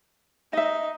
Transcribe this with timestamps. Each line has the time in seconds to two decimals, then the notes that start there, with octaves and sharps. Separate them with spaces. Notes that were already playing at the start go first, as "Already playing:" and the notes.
0.53 D#4 D#5 E5